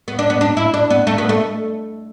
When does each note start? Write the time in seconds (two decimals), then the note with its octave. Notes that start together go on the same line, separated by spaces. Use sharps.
0.08 B3
0.19 D4
0.30 B3
0.41 D4
0.57 E4
0.74 D4
0.90 B3
1.07 A3
1.18 B3
1.29 A3